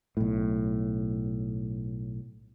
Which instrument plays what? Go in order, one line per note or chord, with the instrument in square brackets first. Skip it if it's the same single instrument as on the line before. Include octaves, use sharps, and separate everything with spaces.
[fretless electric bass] B1 A2